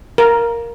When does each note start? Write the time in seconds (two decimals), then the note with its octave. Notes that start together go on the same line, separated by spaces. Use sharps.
0.18 A#4